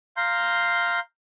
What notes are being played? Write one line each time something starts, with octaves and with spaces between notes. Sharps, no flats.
F5 A#5 C6 G6